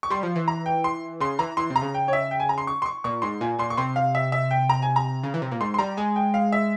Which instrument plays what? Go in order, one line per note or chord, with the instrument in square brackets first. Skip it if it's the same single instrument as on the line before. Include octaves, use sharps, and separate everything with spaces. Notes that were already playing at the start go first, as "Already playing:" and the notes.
[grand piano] C#6
[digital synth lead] G3 [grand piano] C6
[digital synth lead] F3
E3
[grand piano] A#5
G5
C6
[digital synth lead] C#3 [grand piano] C6
[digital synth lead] E3 [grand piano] A#5
[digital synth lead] E3 [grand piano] C6
[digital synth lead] C3
[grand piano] A#5
[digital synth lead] C#3
[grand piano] G5
C#5
E5
G5
G#5
A#5
C6
C#6
C6
C#6
[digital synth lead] A#2 [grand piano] C#6
[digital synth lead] G#2 [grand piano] C6
[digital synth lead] A#2 [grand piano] G#5
[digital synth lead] A#2 [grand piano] C6
[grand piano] C#6
[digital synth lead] C3 [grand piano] C6
[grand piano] F5
E5
E5
G5
A#5
G#5
A#5
[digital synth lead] C#3
E3
C3
A#2
[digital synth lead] G#2 [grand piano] C6
[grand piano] C6
[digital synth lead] G3 [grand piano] A#5
[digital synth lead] G#3 [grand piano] G#5
[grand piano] G5
F5
E5